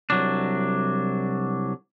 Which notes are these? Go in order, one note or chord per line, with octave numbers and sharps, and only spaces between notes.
C2 F#3 D4